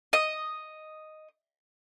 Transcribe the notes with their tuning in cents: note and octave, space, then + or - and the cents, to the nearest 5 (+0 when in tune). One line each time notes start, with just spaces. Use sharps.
D#5 +0